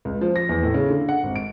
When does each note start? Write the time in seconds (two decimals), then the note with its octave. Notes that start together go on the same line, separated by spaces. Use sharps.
0.05 C#2
0.21 F3
0.36 A#6
0.49 E2
0.63 A2
0.74 C#3
0.90 D3
1.09 F#5
1.23 G#1
1.36 D7